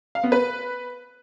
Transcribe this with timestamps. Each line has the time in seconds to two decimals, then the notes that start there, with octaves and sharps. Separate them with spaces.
0.15 F5
0.24 B3
0.32 B4